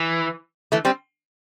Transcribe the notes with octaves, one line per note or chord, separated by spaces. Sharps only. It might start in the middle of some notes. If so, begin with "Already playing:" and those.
Already playing: E3
E3 A3
G3 C4